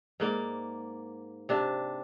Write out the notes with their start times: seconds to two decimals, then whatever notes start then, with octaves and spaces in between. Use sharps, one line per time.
0.20 G#2 A#3 D5
1.49 C3 D4